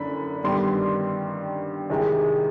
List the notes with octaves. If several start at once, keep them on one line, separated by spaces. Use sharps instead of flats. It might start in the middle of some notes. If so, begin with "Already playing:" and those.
Already playing: F#1 F#2 D3 B5
G2 D#3 G3 B3 C6
E2 C3 D#3 G#3